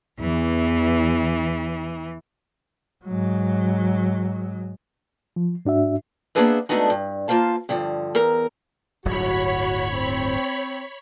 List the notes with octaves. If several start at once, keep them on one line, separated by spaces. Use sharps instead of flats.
E2 E3
G#2 F#3
F3
G#2 D4 F#4 E5
A#3 B3 D4 G#4 B4 E5
G#3 A3 B3 D4 D#4 F#4
G2
A#3 F4 C5 F5 A5
G2 D3 F3
E2 A#4 A#5
D1 G1 F#3 F#4 C#5 B5
C4